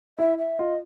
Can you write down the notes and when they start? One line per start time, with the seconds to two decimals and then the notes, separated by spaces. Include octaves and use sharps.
0.19 E4 E5
0.38 E5
0.59 F4 D#5